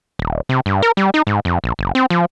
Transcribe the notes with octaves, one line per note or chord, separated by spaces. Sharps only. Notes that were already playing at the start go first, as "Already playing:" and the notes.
D#1
C3
G2
A#4
G3
D#4
G#2
F2
A#1
F#1
C4
F3